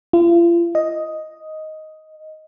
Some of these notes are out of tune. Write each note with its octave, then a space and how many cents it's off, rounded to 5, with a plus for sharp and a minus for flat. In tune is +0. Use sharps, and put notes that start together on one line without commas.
F4 -40
D#5 +5